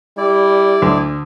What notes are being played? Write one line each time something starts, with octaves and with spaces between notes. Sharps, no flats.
G3 E4 D5
D2